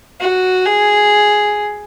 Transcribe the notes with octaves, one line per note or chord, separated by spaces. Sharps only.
F#4
G#4